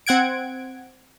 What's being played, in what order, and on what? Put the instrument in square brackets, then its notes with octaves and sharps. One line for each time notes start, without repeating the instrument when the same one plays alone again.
[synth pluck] C4 F#5 G#6 D7